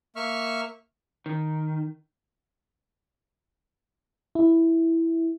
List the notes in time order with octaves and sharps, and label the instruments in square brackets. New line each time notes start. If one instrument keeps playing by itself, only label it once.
[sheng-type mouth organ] A#3 E5 C#6 F6
[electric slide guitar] D#3
[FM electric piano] E4